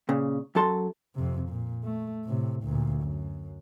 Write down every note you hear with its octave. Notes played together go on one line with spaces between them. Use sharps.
A#2 C#3
F#2 F#3 A4 A5 C6
F2 C3
A#2
A3
A2 C3
D2 A#2
F#2